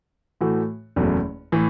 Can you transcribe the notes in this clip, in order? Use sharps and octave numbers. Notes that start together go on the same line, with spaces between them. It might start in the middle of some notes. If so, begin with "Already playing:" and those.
A2 E3 A3 F#4
F#1 E2 B2 A3 C#4
A2 E3